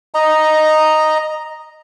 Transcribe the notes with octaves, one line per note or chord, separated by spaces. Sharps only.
D#5 A#5